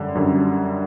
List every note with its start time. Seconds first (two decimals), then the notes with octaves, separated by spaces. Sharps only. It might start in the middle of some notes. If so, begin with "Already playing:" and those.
Already playing: F#2 D3 G3
0.15 F#2 D3 G3